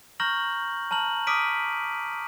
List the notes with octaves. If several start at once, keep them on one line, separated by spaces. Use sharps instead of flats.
A#5 C#6 F6 G6 A#6 F#7
A5 A#5 F6 F#7
D6 D#6 F6 B6 D7 D#7